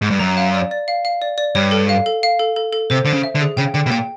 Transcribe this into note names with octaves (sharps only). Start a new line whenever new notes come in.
G#2
G2
F#2 A#5
F5
D5
D5
F5
F5
D5
D5
G2 C#5
A4
F5
A4
F5
A4
A4
A4
C3 C5
D3 C5
C#3
E5
D3
G#4
C#3 G5
D3 G5
B2
A#2 G5